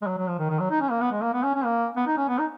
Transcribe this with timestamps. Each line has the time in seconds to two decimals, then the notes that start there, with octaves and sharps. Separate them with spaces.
0.02 G#3
0.07 F#3
0.18 F#3
0.28 F3
0.39 D#3
0.50 D#3
0.60 F#3
0.71 D#4
0.81 C#4
0.91 A#3
1.01 B3
1.12 G#3
1.22 A#3
1.34 B3
1.43 C#4
1.55 C#4
1.65 A#3
1.96 B3
2.07 D#4
2.17 C#4
2.28 B3
2.39 D#4